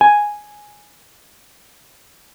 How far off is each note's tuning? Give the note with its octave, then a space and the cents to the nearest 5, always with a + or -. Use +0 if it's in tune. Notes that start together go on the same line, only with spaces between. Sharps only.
G#5 +0